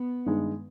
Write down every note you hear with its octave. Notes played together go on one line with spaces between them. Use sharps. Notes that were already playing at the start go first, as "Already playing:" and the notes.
Already playing: B3
G2 D#3 G#3 D#4